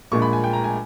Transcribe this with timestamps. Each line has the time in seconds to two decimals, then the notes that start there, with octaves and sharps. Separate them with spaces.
0.11 A#1 A#2 G#3 C#6
0.22 B5
0.33 G#5
0.44 G5
0.53 A#5
0.64 G#5